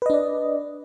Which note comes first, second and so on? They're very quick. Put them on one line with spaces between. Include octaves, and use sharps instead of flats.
B4 D#5 D4 D5